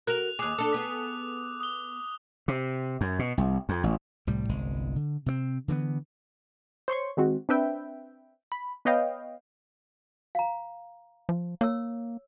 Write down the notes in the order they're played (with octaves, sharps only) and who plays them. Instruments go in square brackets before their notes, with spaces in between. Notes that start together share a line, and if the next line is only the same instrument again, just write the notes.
[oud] F#4 A#4 [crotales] F#6 F7
[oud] D#2 G#4 [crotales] D6 D#6 F#6
[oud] D4 A4
B3 G#4
[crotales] D#6 G7
[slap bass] C3
F#2
B2
C2
F2
A1
C2 A2 G3
G1 C2 G#3
D3
C3 A3 C4
D3 E3 A3 B3
[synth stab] C5 C#5 C6 C#6
D#3 G#3 C4 F#4
C4 D4 B4 E5 G5
B5
B3 B4 C#5 D#5 F5 G5
[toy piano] F5 A#5
[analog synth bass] F3
[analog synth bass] A#3 [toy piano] C#5 E6